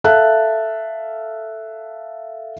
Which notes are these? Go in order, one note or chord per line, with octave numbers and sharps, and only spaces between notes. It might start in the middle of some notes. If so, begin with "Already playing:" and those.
A4 E5 F5 A5 F#6